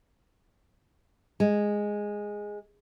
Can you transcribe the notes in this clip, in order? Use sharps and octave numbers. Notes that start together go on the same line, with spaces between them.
G#3